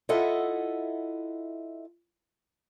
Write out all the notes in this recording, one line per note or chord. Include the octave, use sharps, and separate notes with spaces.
E4 F4 A4 D#5 E5 F#5